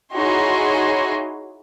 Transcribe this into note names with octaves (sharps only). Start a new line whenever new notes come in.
D#4 E4 F#4 G#4 C#5 C6